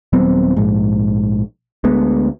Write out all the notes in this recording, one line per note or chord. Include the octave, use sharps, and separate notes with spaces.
D#1 F#3 B3 C4
A#1 G#2
D2 G#3 B3